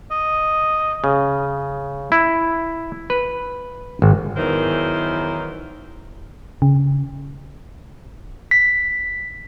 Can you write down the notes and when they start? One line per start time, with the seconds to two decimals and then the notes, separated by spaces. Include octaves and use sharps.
0.11 D#5
1.04 C#3
2.12 E4
3.10 B4
4.02 G#1
4.37 E2 D#3 E3 F#3 A#4 C5
6.62 C#3
8.51 B6